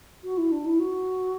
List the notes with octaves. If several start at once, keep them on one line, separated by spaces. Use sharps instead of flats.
F#4
E4
D4
E4
F#4